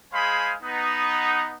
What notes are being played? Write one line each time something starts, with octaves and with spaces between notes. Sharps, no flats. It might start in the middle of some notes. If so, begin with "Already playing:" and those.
G#3 G#4 C5 F5 G#5 B5
B3 D#4